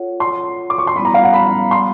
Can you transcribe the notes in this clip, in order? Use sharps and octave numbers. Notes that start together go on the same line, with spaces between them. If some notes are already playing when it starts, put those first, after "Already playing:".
Already playing: F4 A4 C#5 F#5
C6
D6
C#6
C6
G3 B3 E4 B5
A#5
F5
F#5
B5
C6